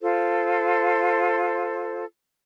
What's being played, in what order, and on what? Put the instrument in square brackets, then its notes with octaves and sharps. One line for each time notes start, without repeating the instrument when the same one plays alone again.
[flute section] F4 A4 C5